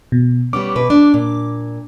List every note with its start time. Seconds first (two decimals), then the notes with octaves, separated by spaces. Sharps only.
0.12 B2
0.53 G3 B3 C#4 D6
0.76 B2 B4
0.90 D4
1.14 A#2